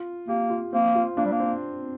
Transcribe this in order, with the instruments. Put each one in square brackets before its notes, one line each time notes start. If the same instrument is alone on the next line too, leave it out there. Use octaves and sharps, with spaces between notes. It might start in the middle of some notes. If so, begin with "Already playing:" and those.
Already playing: [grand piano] F4
[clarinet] A#3 [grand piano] G4
[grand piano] F4
[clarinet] A#3 [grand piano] C4
[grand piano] F4
[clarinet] A#3 [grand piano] D4
[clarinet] G3
A#3
[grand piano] C4